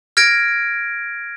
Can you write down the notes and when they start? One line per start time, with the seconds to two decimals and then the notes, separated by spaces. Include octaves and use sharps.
0.17 F6 G#6 A#6 D7